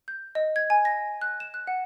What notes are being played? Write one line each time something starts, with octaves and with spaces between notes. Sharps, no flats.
G6
D#5
G#6
G#5
A#6
F#6
E7
F#6
F#5